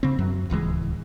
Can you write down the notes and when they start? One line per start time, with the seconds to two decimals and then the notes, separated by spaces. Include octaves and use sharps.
0.03 C#3 C4
0.19 F#2 F#3
0.50 D1 C#2 E3 G#3